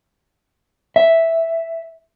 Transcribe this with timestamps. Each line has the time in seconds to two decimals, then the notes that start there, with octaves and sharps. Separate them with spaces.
0.96 E5